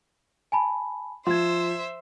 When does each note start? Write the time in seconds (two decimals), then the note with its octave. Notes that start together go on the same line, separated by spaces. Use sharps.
0.52 G#5 A5 B5
1.27 F3 C5 E5 C6 G#6